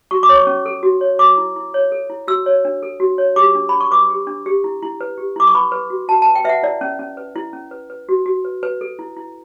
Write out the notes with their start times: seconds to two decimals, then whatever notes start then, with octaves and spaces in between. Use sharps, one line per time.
0.11 F#4 C#6
0.23 D6
0.29 C#5
0.35 C#6
0.47 C#4
0.66 A4
0.83 F#4
1.01 C#5
1.19 A4 D6
1.37 E4
1.56 E4
1.74 C#5
1.92 A4
2.10 E4
2.28 F#4 E6
2.46 C#5
2.65 D4
2.83 A4
3.00 F#4
3.18 C#5
3.36 G4 D6
3.55 D4
3.69 D4 B5
3.80 C#6
3.91 B4 D6
4.10 G4
4.27 D4
4.46 G4
4.64 E4
4.82 E4
5.01 B4
5.18 G4
5.36 E4 D6
5.47 C#6
5.54 B4 B5
5.72 B4
5.90 F#4
6.08 F#4 A5
6.22 A5
6.26 B4
6.35 G5
6.44 B4 E5
6.49 F#5
6.63 E4 D5
6.81 C#4
6.99 C#4
7.17 B4
7.36 E4
7.53 C#4
7.71 B4
7.90 B4
8.09 F#4
8.26 F#4
8.45 B4
8.63 B4
8.81 A4
8.99 E4
9.17 E4